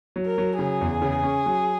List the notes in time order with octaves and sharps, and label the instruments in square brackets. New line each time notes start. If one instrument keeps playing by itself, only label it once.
[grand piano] F#3
[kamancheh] A#4
[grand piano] F#3
[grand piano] C#3 [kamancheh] G#4
[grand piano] E2
C#3
C#4
F#3